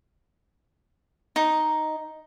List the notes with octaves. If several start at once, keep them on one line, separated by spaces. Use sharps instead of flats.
D#4